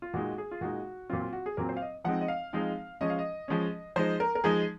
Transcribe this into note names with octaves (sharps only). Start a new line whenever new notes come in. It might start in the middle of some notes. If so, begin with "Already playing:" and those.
F4
A#2 G#3 D#4 F#4
G#4
F4
A#2 G#3 D#4 F#4
A#2 F#3 C4 F4
F4
F#4
G#4
A#2 F#3 C4 A#4
C5
F5
D#5
F3 G#3 C4 D#4 F#5
D#5
F5
F3 G#3 C4 D#4
F3 G#3 C#4 D#5
F5
D#5
F3 G#3 C#4
F3 G#3 D#4 C5
A#4
A#4
F3 G#3 D#4 G#4